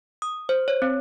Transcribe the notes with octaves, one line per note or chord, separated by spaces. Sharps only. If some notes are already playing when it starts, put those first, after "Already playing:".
D#6
C5
C#5
C4